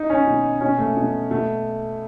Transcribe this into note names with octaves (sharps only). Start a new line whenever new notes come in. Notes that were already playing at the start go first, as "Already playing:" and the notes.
Already playing: D#4
C#4
B2
B2 C#4
A3
B2
B2 A3